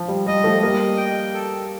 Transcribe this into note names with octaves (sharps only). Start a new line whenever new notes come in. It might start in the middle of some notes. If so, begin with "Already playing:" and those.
Already playing: F3
G3
G3 D#5
F3 A3
G3 A#3 D#5
G5
A4